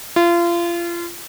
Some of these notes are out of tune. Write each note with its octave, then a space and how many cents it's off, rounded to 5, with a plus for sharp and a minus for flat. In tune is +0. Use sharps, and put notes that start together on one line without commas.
F4 -30